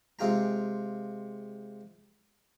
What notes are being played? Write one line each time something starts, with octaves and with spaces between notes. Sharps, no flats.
C3 G#3 F4 G5 A#5